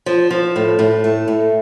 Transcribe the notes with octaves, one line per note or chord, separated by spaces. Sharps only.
F3
F3
A2
A2
A3
A2